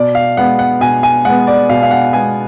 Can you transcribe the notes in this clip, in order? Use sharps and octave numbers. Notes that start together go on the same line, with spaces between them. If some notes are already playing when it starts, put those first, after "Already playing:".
Already playing: B2 D5
F5
G#3 B3 F#5
F#5
B2 G#5
G#5
G#3 B3 F#5
D5
B2 F5
F5
F#5
G#3 B3 G#5